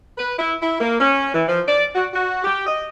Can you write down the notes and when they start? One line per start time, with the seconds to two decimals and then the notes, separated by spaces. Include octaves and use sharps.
0.18 B4
0.38 E4
0.60 E4
0.81 A#3
1.00 C#4
1.33 E3
1.48 F3
1.67 D5
1.94 F#4
2.12 F#4
2.44 G4
2.66 D#5